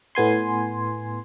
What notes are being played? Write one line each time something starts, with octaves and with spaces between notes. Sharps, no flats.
A2 B3 G#5 C6